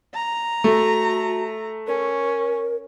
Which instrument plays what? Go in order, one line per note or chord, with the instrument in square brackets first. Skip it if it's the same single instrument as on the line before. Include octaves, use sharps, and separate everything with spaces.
[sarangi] A#5
[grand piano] A3 [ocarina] F#4
[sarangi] C#4 [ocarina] A#4